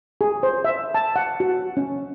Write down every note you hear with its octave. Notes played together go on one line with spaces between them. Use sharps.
G#4
C5
E5
A5
F#5
F#4
C#4